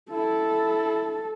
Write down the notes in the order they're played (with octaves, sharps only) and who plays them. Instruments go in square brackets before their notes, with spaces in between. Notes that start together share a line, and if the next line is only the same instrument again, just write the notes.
[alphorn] E4 [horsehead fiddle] A4